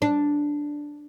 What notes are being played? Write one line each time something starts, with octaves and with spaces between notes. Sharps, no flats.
D4